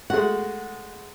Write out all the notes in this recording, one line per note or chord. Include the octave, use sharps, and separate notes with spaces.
G#3 A3 F#4 F#5